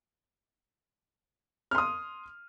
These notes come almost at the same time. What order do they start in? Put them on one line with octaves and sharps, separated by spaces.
F6 C6 D#6